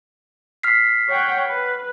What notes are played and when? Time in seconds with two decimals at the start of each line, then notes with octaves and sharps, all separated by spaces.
0.63 F6 B6 C7
1.08 C#5 F#5 G5
1.47 B4